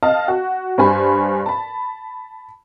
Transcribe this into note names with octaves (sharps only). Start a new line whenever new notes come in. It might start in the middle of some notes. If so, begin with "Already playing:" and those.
D#5 F5 A5
F#4
G2 C5 G#5 B5
A5 B5